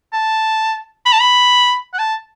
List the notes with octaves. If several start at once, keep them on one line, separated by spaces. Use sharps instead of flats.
A5
B5
A5
B5
F#5
A5